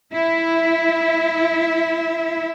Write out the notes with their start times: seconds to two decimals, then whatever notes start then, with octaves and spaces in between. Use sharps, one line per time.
0.13 E4 E5